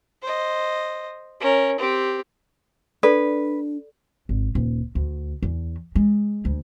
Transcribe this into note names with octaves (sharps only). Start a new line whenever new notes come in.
C5 D#5
C#4 A#4
C4 G4
D4 A4 B4 D5
G#1
D#1
D2
E2
G#3
D2